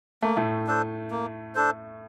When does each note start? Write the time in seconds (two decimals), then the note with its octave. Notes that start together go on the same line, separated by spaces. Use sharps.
0.22 A3 A#3
0.37 A2 A3
0.67 D4 A4 C5
1.11 A#3
1.55 D4 A4 C5